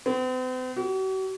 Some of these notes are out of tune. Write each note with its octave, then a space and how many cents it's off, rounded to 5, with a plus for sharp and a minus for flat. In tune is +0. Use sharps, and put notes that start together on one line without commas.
C4 -45
F#4 +45